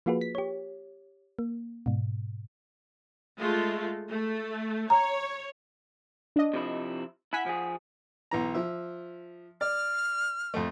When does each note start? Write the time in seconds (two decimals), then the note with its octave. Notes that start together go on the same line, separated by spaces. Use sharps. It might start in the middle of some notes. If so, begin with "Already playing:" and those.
0.06 F3 A#3 F4 F#4 G#4 B4
0.21 B6
0.35 G4 C#5
1.39 A#3
1.86 G#2 B2
3.39 G#3 A3 F4
4.09 A3
4.90 C#5 A#5
6.36 D4 D#5
6.54 C3 F3 E4
7.33 E4 F#5 G#5 B6
7.46 F3 G#4
8.31 B1 E3 A#5
8.54 F3 E5
9.61 D5 F6
10.54 F2 A3